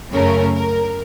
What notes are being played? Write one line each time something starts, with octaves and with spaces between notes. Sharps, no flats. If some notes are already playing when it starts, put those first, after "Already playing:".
F#2 C#3 A3 C#4 A#4
A#4